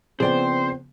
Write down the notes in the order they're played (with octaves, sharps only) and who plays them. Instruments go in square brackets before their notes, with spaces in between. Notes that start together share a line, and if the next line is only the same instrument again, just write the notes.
[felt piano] C#3 F3 B3 [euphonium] C4 [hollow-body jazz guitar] G#4 D5 G5 [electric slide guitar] C5